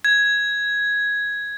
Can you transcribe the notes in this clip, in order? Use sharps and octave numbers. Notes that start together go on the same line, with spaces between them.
G#6